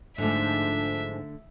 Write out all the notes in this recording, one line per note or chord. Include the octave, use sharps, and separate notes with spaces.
G#2 D3 F3 A3 D4 E5